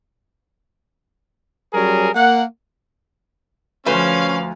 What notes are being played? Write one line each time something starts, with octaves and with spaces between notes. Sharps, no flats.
F#3 G3 C#4 G#4 A#4
A#3 F#5
D2 F3 C#4 B4 C5 F5